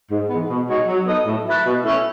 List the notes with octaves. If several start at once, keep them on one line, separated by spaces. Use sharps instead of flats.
G#2
E3 G#3 B3
B2
G#3 D#4 F#4 C#5
F#3
B3 D#4 A4 D#5
A2
F#3 A3 E4 B4
B2
A3 C#4 E4